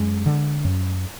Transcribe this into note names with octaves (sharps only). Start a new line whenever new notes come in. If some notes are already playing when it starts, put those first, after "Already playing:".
Already playing: F#2 G#3
D3
F#2